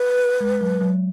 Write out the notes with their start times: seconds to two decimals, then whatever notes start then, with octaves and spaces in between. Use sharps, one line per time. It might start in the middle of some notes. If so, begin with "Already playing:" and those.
Already playing: B4
0.41 G#3
0.61 F#3
0.81 F#3